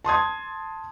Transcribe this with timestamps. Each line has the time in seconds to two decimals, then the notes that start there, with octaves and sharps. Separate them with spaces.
0.04 A5 C6 D#6 G#6